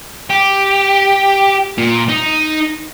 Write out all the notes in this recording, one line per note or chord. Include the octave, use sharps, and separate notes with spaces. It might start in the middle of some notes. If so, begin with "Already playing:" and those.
G4
A#2
D#4